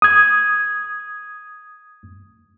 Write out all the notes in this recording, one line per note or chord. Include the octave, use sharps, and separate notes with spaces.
D#6 G#6